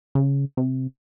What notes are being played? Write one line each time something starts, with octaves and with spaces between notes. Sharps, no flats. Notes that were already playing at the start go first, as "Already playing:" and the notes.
C#3
C3